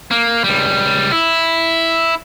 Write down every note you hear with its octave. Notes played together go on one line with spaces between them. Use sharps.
A#3
C#2 G3
E4